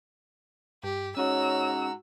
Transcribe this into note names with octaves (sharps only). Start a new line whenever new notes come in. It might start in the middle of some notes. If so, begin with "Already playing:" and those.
G2 G4
G#2 C#4 F#4 C#5 A#5 E6